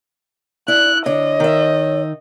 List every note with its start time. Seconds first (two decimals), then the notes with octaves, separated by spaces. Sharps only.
0.68 E4 D5 F#6
1.06 D3 C#5 D#5
1.40 D#3 E5